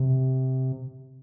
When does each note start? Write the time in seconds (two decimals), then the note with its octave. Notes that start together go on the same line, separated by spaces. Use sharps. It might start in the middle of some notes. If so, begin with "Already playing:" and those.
Already playing: C3